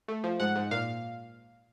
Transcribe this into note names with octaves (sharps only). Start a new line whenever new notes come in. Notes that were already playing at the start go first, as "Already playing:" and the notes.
A3
F3
G#2 F#5
G#2
A#2 F5